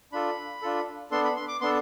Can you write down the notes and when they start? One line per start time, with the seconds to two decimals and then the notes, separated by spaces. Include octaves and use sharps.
0.12 D4 F4 A4 B5
0.62 D4 F4 A4
1.11 B3 D4 A4 C6
1.24 B5
1.36 C6
1.48 D6
1.61 B3 D4 A4 C6